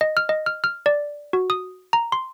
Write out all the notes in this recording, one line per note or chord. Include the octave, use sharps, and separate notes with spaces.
D#5
F6
D#5
F6
F6
D5
F#4
D#6
A#5
C6